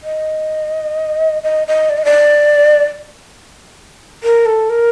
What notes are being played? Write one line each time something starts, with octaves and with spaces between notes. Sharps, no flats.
D#5
D#5
D#5
D5
D#5
D5
A#4
A4
A#4